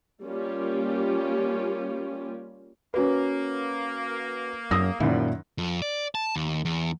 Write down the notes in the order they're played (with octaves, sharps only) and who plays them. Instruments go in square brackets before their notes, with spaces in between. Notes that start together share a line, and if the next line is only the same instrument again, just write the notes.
[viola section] G3 A#3 C#4 F4 G4
[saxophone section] A#3 [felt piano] C#4 F#4 B4
[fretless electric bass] F#2 [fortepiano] D#6 E6 [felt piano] A#6
[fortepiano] F#2 D#3 E4 [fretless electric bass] A#2 [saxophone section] F3 G3
[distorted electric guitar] F2
D5
A5
D#2
E2